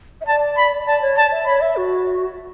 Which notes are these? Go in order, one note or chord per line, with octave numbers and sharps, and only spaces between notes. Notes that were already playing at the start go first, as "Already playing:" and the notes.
E5
D5 A5
B5
D5 A5
C#5
D5 A5
E5
C#5 B5
E5
F#4